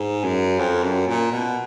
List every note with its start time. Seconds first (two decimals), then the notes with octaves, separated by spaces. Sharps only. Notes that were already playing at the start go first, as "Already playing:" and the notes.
Already playing: G#2
0.24 F#2
0.59 F2
0.83 F#2
1.07 A#2
1.31 B2